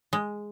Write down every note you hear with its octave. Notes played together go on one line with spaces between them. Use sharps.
G#3